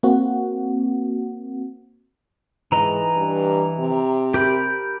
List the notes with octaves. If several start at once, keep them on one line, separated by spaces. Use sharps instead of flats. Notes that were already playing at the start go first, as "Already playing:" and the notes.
A#3 C4 F#4
G#2 E3 B4 D#5 A#5
G2
C3
G4 A#4 B5 G6